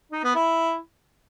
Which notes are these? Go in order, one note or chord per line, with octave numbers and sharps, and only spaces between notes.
D#4
B3
E4